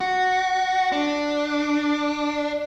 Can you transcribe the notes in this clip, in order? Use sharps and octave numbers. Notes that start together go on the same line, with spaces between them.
F#4
D4